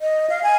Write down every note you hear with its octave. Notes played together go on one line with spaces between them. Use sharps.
D#5
F5
G#5